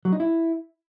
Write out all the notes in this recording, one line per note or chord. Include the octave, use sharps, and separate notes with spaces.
F#3
D#4
E4